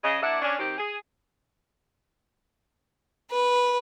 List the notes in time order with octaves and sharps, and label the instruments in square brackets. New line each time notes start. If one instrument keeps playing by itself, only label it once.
[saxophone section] C#3 G#4 D#5
A#3 D4 E4 D5 E5 F#5
C#4 D4
D#3 C4 G4
G#4
[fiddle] B4